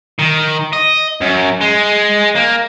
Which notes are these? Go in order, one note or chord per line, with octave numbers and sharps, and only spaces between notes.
D#3
D#5
F#2
G#3
A#3